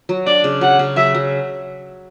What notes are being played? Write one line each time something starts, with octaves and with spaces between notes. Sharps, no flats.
F#3
D4 D5
C#3
F#3 F#5
C#3
F#3 E5
F#3